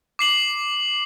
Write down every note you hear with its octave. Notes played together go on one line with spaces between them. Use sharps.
D6 C7 F#7